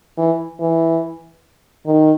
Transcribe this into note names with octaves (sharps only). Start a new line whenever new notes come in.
E3
E3
D#3